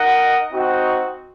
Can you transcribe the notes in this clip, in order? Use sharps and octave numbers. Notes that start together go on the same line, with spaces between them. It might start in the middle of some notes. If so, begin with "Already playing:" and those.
Already playing: D#4 A#4 D#5 F#5
C4 D#4 F#4